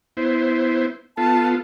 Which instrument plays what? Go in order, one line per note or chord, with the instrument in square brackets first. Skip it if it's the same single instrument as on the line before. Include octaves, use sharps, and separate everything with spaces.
[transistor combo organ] B3 E4 C5
[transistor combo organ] B3 F4 A4 [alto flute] A5